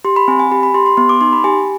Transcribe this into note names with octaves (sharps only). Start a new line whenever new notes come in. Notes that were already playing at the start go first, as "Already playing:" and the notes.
G4 C6
B5
C4 G#5
G#5
G4 B5
B5
G4 C6
C6
B3 C6
D6
D#4 C6
B5
G4 G#5